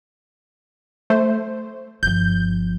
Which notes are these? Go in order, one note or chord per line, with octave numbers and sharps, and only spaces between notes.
A3 C5
G1 F3 G6